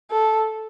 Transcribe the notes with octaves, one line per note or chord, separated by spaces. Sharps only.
A4